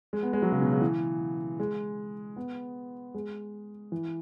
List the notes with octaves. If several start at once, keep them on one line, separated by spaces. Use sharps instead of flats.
G#3
B3
G#3
F#3
C#3
B2
C#3
E3
G#3
B3
G#3
E3